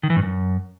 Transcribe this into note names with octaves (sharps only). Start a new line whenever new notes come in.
D#3
E3
G2
F#2